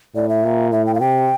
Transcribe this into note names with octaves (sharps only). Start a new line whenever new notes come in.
A2 D5
E5
A#2
A2 E5
G5
F5
C3 G5